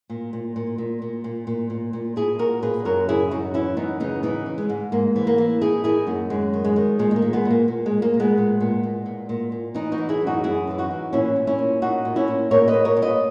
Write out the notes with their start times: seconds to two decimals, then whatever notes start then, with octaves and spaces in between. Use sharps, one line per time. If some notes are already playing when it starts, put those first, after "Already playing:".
0.10 A#2
0.33 A#2
0.56 A#2
0.78 A#2
1.02 A#2
1.24 A#2
1.47 A#2
1.70 A#2
1.93 A#2
2.16 A#2 E4 G#4
2.39 A#2 F#4 A#4
2.62 A#2 G#4 B4
2.85 F#2 F#4 A#4
3.09 C#3 E4 G#4
3.31 F#2 D#4 F#4
3.54 E3 C#4 E4
3.77 F#2 B3 D#4
4.00 C#3 B3 D#4
4.23 E3 B3 D#4
4.46 E3
4.58 G#3
4.70 G#2
4.92 G#2 A#3
5.16 E3
5.27 A#3
5.38 E3
5.61 D#3 E4 G#4
5.84 D#3 E4 G#4
6.07 F#2 A#3
6.30 F#2 G#3
6.53 D#3
6.64 G#3
6.76 D#3
6.99 A#2 G#3
7.11 G#3
7.16 A#3
7.22 A#2
7.33 G#3 B3
7.45 A#2
7.51 A#3
7.68 A#2
7.86 G#3
7.92 A#2
8.02 A#3
8.14 A#2
8.20 G#3 B3
8.37 A#2
8.60 A#2
8.83 A#2
9.06 A#2
9.29 A#2
9.52 A#2
9.74 E3 B3 D#4
9.92 D#4 F#4
9.98 E3
10.09 E4 G#4
10.22 F#2
10.27 D#4 F#4
10.44 F#2 E4 G#4
10.67 E3 E4
10.78 D#4 F#4
10.91 E3
11.13 A#2 C#4 E4
11.36 A#2
11.47 C#4 E4
11.59 A#2
11.82 A#2 D#4 F#4
12.05 A#2
12.16 C#4 E4
12.28 A#2
12.51 A#2 A#4 C#5
12.68 B4 D#5
12.74 A#2
12.85 A#4 C#5
12.97 A#2
13.02 B4 D#5